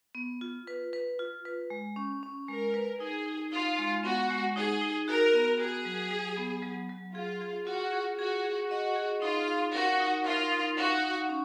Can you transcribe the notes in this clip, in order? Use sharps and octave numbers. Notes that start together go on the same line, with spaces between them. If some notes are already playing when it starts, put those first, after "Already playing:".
B3
F4
B4
B4
F4
B4
G#3
C#4
C#4
G#3 A#4
B4
D#4 G#4
D#4
D#4 F4
G#3
B3 F#4
G#3
D#4 G#4
D#4
F#4 A#4
B3
F#4 G#4
F#3
F#3
B3
F#3
F#3
F4 G#4
G#4
F4 F#4
G#4
F#4 G#4
G#4
F#4 D#5
G#4
D#4 F4
F5
F#4 A#4
D#4
F4 A#4
D#4
F#4 F5
D#4
C#4